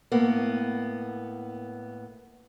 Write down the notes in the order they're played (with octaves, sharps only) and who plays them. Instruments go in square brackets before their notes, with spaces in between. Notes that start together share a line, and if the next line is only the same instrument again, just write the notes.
[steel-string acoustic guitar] A2 A#3 B3